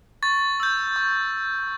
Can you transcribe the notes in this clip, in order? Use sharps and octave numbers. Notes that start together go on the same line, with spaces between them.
C#6 A6
E6 G6
C#6